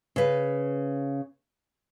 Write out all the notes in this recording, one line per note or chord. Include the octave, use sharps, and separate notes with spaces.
C#3 B4